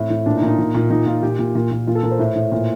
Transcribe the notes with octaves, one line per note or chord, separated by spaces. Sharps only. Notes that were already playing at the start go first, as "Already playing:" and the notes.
Already playing: A2 C4
A2
A#2 D4
D#4
A#2
D#4
A#2
A#2
A#2 D#4
A#2 F4
A#2 G4
A#2
A#2
A#2
A#2 F4
A4
A#2 A#4
C5
A2
A2
A#2